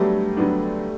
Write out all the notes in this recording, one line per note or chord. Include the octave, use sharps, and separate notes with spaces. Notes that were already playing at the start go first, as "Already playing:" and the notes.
Already playing: D3 F#3 G3 A3 B3 D4
D3 F#3 B3 D4